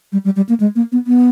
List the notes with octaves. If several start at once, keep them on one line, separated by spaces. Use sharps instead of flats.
G3
G3
G3
A#3
G#3
A#3
B3
B3